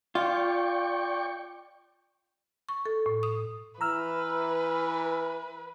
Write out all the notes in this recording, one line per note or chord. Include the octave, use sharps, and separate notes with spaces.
F4 D5 G5 C#6
C#6
A4
A2
D#6
E3 B4 A#5 E6 F6